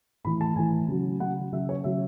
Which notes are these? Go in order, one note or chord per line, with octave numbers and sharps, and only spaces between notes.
A2 E3 B5
A5
A2 E3 G#5
C#3 F#3
C#3 F#3 F#5
C#3 F#3 E5
C#5
C#3 F#3 E5